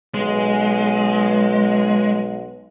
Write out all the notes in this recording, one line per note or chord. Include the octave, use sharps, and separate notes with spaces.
B1 G#3